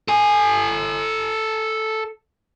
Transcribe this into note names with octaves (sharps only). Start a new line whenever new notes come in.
A4 G#5